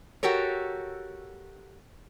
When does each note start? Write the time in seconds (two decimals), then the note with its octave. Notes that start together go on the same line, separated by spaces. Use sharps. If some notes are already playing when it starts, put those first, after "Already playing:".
0.23 F#4 G4 A4 A#4 C#5